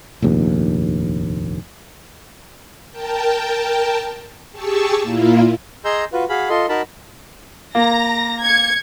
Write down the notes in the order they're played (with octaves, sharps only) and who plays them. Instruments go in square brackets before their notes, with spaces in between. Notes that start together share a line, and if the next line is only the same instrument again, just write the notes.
[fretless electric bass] F1 A#1 D#2
[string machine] A#4 G5 A5
G4 G#4 A5 C#6 E6
A#2 A#3 E4 F4
[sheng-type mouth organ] G#4 D#5 A#5 C6 E6 G6
F4 F#4 B4
F#4 G#4 F5 B5
F4 A4 D#5 C6
D#4 F#4 A#4 A5 B5
[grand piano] A#3 [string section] A#5 A#6
[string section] G#6 C#7